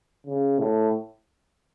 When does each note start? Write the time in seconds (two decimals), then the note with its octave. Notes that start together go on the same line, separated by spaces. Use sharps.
0.27 C#3
0.59 A2